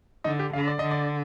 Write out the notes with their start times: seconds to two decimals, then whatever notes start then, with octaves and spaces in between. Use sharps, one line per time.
0.24 D3 D#4
0.39 G4
0.53 D3 F5
0.68 D5
0.79 D3 D#5
0.91 D5